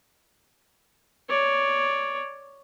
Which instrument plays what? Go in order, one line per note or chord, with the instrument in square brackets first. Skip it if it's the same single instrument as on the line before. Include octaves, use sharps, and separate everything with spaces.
[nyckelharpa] C#5 D5